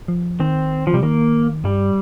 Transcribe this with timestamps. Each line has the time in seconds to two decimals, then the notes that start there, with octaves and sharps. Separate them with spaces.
0.08 F3
0.40 D#3 C4
0.87 F3
0.94 C3 G3
1.03 D#3 A#3
1.64 G2 G3